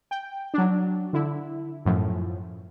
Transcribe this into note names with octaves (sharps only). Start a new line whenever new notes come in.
G5
F#3 D4
D3 E4
F#2 A2 F3